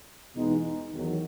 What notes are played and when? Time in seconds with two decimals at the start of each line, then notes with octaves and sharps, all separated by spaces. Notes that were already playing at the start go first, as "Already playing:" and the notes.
0.36 E2 B2 G#3 B3 D#4
0.92 E2 D#3 F#3